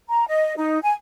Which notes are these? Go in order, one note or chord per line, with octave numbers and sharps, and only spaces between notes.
A#5
D#5
D#4
G#5